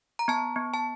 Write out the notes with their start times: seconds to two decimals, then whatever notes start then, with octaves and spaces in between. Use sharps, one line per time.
0.19 A#5
0.28 B3 A5
0.56 B3
0.74 A5